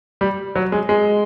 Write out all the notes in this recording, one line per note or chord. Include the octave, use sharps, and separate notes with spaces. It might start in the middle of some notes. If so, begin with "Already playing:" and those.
G3
F#3
G#3
G#3